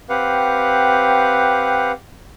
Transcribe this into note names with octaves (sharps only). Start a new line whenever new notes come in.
C4 G4 B4 F5 F#5